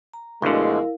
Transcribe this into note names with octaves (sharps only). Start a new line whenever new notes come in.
A#5
D2 B2 D3 F3 G#3 E4 A#4 F5